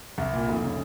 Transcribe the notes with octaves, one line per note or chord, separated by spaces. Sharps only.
C2
A#2
F1
C#3